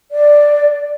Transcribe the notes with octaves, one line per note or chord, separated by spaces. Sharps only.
D5